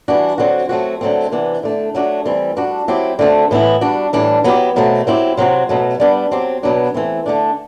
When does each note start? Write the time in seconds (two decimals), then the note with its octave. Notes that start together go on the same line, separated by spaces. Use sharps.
0.08 E3 G3 D4 F#4
0.38 D3 F#3 C4 F#4
0.69 F#3 A3 C4 F#4
1.01 D3 F#3 A3 C4
1.32 C3 E3 B3 D4
1.63 D3 A3 D4
1.95 F#3 A3 D4 F#4
2.25 E3 G3 C4
2.56 G3 D4 F#4
2.88 F#3 C4 E4 G4
3.19 D3 A3 C4 F#4
3.51 A2 E3 B3 E4
3.81 G3 D4 F#4
4.13 A2 E3 G3 D4
4.44 F#3 B3 E4 G4
4.76 B2 F#3 A3 C4
5.07 F#3 C4 E4 G4
5.37 C3 F#3 C4 F#4
5.69 B2 F#3 A3
6.00 G3 B3 D4
6.32 F#3 C4 G4
6.63 B2 F#3 B3 D4
6.94 E3 A3 C4
7.26 D3 A3 D4